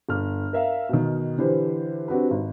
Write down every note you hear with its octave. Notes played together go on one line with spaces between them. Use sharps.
G1 F6
A#4 E5 F5
B2 D#3
D3 E3 D4 G4 B4 C5
C4 D4 F#4 G4 B4
G#1